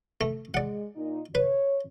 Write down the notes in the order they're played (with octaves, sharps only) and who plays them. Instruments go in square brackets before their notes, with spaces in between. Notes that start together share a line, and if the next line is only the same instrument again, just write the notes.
[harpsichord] A3
[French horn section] G#3 [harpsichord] D5 F#5
[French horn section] A#2 D#4
[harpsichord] B4 [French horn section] C#5